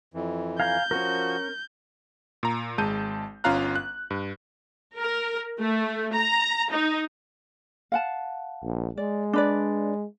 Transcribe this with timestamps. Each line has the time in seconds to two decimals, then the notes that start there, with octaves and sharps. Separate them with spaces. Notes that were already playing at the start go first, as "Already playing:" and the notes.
0.14 F2 E3
0.60 F5 G#5 A#5 G6
0.91 F3 C#4 F#4 A#4
2.43 A#2 A#5
2.78 G#1 G#3 A5 G6 D#7
3.44 G1 C#4 F4 F5 A#5 F#6
3.75 F#6
4.10 G2
4.97 A#4
5.60 A3
6.14 A#5
6.71 D#4
7.92 F5 F#5 A5
8.63 A#1
8.97 G#3 D5
9.33 D4 B4 D5